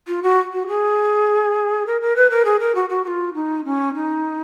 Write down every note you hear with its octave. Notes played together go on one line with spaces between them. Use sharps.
F4
F#4
F#4
G#4
A#4
A#4
B4
A#4
G#4
A#4
F#4
F#4
F#4
F4
D#4
C#4
D#4